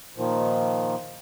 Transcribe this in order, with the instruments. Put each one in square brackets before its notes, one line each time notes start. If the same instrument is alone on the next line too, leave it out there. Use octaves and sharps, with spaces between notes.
[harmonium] A#2 D#3 F3